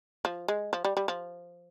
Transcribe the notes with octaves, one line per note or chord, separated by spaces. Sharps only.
F3
G#3
F3
G3
G3
F3